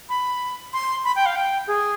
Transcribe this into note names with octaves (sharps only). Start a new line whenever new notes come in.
B5
C6
B5
G5
F5
G5
G#4